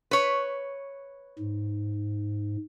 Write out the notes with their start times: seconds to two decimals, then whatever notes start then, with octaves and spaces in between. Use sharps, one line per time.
0.11 B4 C#5
1.39 G#2